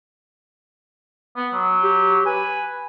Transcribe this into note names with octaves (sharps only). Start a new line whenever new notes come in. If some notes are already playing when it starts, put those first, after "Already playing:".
B3
F#3
G4
B4 G#5